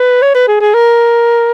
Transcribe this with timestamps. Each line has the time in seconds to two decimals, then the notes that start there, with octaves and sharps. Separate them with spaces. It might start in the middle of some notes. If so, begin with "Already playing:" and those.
Already playing: B4
0.22 C#5
0.35 B4
0.48 G#4
0.61 G#4
0.74 A#4